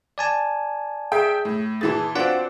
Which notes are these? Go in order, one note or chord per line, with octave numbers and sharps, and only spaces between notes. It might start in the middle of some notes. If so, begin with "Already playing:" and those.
D5 G#5 A5
G#4 E5 G5
A2
A#2 E3 G#4 A5 A6
C4 D4 F4 F#4 B4 D5 F#5